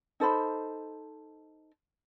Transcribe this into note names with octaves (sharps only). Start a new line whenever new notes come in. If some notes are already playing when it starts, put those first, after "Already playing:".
D#4 A4 C5 B5